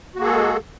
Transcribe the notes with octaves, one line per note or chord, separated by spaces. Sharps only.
G#3 A#3 F#4 G#4 A4